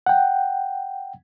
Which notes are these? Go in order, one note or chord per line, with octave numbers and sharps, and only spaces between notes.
F#5 G5